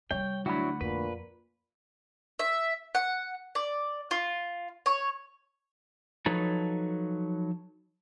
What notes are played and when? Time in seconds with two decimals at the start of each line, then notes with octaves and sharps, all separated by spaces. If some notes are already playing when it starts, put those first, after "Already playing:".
0.11 C3 G3 C#5 G5
0.46 D2 F#3 D4 E4 F#4 F#5 B5
0.81 F2 A#2 B4
2.39 E5
2.95 F#5
3.55 D5
4.11 F4
4.86 C#5
6.26 F3 F#3 D#4 A4 B4 C#5